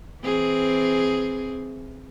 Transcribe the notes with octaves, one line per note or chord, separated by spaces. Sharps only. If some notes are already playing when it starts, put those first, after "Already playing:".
E3 C4 G#4